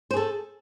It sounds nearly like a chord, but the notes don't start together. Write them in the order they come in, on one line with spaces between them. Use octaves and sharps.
C5 G#4 A4